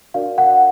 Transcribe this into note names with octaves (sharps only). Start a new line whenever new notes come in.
D4 F#4 A#4 D5 F5
F#5